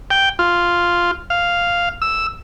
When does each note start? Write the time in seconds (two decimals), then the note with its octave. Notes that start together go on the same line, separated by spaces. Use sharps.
0.10 G5
0.39 F4
1.30 F5
2.02 E6